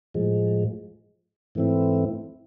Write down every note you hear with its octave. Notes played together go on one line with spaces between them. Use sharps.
A2 F3 G#3
G#2 E3 A3 C4 E4